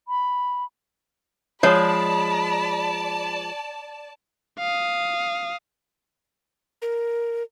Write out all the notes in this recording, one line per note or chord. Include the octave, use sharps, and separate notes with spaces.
B5
F3 G#3 C#5 D5 A5 B5
F5 D#6
A#4